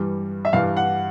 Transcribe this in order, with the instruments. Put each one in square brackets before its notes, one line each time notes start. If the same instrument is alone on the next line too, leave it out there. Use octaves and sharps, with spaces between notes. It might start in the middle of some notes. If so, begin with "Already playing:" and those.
Already playing: [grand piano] G2 E3 G3
E5
G2 E3 G3 F5
F#5